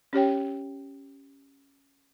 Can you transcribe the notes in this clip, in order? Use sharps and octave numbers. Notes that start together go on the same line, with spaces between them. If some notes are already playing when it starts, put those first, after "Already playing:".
C#4 G4 C#5 G5